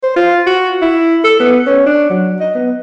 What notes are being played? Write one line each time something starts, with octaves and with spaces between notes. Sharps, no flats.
C5
F4
F#4
E4
A4
B3
C#4
D4
F#3
D#5
B3